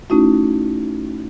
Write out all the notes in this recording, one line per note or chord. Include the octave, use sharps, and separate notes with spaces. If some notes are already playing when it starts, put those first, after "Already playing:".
A3 C#4 D#4 E4 F#4